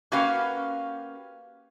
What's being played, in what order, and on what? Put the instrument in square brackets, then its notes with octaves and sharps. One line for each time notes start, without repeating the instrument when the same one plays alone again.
[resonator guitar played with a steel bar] A#3 C#4 F#4 G4 B4 F5